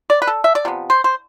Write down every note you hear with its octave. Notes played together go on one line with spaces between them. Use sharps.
D5
B4
A4
E5
D5
C3 F3 B3
C5
C5